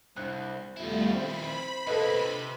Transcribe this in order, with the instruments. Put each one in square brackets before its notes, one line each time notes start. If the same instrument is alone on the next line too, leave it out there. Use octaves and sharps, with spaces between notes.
[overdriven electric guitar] C2 [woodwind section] D4 E4 C5 [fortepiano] F#6
[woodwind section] E2 B2 B3 [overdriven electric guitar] D#3 E4 [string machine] G3 A3 F4
[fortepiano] C4 [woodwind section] C5 [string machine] B5
[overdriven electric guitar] C3 A#3 [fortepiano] A4 B4 D#5
[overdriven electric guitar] C3 [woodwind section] D4 F4